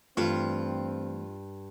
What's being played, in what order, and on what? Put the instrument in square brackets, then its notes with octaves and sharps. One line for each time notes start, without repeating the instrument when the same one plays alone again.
[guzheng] G2 [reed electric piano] E3 A3 [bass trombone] C4 [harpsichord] F4